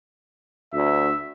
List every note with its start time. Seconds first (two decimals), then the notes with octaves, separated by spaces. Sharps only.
0.73 D2 E5